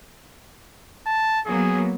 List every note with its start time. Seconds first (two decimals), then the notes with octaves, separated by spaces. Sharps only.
1.07 A5
1.46 F#3 A#3 B3 G#4